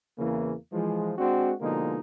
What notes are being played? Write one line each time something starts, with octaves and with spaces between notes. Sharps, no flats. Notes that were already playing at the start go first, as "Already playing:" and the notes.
E2 C#3 E3 A#3
E3 F3 G#3
G#3 C4 D4 F#4
B2 D3 F3 G#3 A#3 D#4